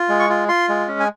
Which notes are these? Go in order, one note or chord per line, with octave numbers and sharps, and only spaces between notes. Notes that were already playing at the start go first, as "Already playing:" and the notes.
Already playing: F4
G#3
C#6
F4
F4 C6
G#3
C#4
G#5